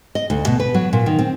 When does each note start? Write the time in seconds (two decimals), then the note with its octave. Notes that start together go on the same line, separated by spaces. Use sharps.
0.15 D#5
0.30 D2
0.47 B2
0.60 B4
0.74 F#3
0.93 A#2
1.06 D#3
1.19 C4